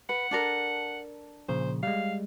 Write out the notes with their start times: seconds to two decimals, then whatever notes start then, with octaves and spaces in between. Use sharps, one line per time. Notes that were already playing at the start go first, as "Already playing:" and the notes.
0.09 B4 F#5
0.31 D4 A4 A#4
1.49 A#2 C#3 F3 C5
1.83 G3 G#3 F5